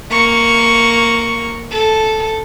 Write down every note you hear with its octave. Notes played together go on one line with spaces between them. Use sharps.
A#3 C#6
A4